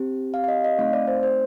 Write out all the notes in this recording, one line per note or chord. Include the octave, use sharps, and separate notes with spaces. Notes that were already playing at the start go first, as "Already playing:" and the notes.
Already playing: C4 G4
F5
F5
D#5
D#5
A3 C4 D#4 F5
D5
C5
C5